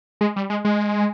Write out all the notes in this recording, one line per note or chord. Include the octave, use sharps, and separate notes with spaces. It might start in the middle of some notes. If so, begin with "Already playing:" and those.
G#3
G3
G#3
G#3